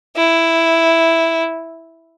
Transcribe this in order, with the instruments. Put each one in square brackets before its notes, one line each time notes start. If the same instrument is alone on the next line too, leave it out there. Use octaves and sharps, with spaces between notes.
[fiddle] E4